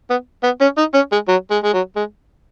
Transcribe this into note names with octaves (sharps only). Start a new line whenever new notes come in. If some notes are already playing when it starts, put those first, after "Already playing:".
B3
B3
C#4
D#4
C#4
G#3
F#3
G#3
G#3
F#3
G#3